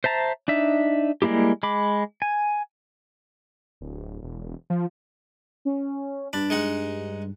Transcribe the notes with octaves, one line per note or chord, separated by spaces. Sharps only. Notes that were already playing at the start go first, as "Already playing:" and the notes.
C5 E5 A5 A#5
D4 D#4 E5
G3 G#3 A#3 E4 G4
G#3 B5 D6
G#5
D1
E1
F3
C#4
G2 D4 B5
G#3 D#4 F#5